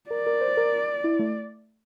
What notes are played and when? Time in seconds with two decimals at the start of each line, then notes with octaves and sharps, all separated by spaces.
0.10 A#4 D5
0.27 A#4
0.41 C5
0.57 A#4
1.04 E4
1.19 A3